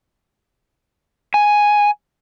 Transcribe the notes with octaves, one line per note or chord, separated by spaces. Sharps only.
G#5